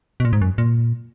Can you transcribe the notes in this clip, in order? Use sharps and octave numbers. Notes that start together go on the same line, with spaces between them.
B2
A#2
G#2
F#2
A#2